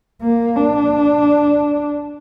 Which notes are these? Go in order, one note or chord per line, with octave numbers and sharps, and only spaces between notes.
A#3
D4